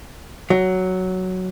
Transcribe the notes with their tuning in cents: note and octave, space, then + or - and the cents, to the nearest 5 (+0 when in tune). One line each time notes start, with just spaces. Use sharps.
F#3 +5